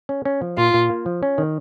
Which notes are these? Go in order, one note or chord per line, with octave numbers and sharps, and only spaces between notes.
C#4
C#4
F3
A#2 F4
A#2
A#3
F3
C#4
D#3